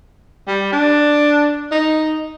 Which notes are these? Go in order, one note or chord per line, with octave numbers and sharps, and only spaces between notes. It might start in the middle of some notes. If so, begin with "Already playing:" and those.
G3
D4
D#4